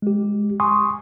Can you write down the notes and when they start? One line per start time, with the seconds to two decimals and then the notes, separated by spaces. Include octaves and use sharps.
0.02 G#3 G4
0.60 G#5 C6 C#6 D#6